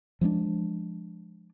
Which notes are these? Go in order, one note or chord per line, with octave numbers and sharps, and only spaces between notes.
F3 G#3 B3 D4